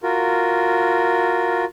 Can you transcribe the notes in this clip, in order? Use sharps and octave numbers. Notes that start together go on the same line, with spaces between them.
F4 F#4 A#4